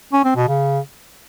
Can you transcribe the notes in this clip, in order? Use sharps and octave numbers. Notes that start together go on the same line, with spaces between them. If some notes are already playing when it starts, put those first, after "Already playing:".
C#4
C4
B2
C#3